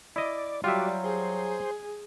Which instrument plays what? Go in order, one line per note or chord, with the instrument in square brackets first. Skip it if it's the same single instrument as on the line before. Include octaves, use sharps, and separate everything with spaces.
[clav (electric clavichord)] E4 D#5 [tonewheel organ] D5
[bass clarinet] F#3 [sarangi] G3 [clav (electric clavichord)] F4 E5 [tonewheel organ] F#4 D5
[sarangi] G#4 [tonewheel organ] C5